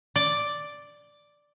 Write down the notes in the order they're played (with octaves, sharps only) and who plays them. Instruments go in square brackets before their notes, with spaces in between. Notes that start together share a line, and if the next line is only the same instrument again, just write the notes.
[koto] D5